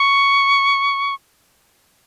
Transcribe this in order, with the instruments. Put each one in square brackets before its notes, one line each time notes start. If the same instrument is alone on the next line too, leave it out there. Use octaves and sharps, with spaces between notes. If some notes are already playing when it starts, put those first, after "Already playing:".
Already playing: [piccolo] C#6